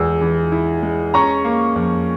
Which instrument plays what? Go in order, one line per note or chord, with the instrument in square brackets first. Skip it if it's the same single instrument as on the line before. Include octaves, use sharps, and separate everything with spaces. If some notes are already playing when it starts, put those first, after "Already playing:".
Already playing: [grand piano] E2 G#3 [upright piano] E6
[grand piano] E3
E4
G#3
[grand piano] C#4 [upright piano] A#5 C#6
[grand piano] A#3
F2